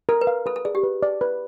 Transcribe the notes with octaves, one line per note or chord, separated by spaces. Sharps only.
A4 A#4
B4
F5
A4 B4
A4
G#4 D5
G4
B4
D5
B4